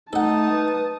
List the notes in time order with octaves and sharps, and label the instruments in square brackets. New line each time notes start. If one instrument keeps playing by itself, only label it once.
[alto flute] A3 [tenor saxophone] D#4 [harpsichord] A4 F#5 [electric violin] A5 D#6
[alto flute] B4